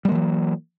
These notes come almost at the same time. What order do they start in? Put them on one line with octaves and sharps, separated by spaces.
G3 A#3 E3 F#3